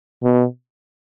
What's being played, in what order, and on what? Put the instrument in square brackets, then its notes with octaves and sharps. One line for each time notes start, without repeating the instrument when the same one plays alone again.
[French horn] B2